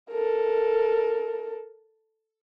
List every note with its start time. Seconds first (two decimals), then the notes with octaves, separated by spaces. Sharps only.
0.11 A4 A#4